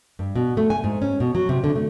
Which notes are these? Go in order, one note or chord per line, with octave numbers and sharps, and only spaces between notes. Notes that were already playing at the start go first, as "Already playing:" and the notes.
G2
B2
A3
G#5
G#2
C#4
B2
F#3
C3
D3
A3